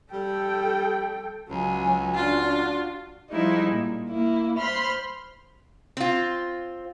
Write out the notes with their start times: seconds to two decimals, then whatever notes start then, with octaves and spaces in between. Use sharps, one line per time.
0.13 G3 A4 G5
1.51 C#2 F#3 G#5
2.15 D4 F4 F#4
3.31 F3 G3 G#3 D#4 E4
3.70 A#2
4.09 A#3 E4
4.58 C5 B5 C6 F6
5.97 C4 F4